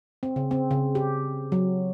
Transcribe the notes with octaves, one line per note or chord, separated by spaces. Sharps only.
C4
C#3
C4
C#3
G4
F#3